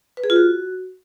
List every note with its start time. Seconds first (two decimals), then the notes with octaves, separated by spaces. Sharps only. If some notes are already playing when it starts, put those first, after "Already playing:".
0.17 B4
0.24 G#4
0.30 F4
0.36 F#4